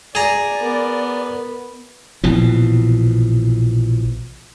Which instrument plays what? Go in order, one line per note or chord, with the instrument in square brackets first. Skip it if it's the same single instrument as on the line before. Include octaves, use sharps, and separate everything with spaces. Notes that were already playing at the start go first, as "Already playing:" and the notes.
[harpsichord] G#4 A#5 [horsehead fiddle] D5
[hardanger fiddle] B3 [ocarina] A#4
[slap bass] A#1 B2 E3 F3